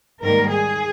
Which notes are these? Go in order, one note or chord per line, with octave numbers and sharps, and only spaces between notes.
G#2 D#3 G3 A#3 A#4
G#4